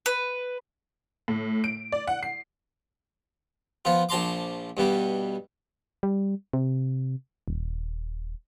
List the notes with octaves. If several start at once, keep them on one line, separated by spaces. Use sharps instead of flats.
B4
A2
D7
D5
F#5
C7
F3 B3 F4
A#1 F3 A5 A#5 C6 D6
G2 B2 G3
G3
C3
D#1